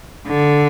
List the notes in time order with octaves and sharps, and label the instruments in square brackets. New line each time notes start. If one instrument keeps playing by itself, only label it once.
[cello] D3